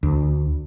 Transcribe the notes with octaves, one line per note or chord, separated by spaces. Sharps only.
D2